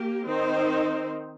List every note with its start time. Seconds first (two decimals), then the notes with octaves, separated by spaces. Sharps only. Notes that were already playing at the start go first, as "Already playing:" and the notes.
Already playing: A#3 G4
0.25 D#3 C4 D#4 C5